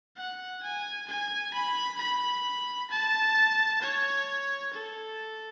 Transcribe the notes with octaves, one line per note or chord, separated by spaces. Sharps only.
F#5
G#5
G#5
B5
B5
A5
C#5
A4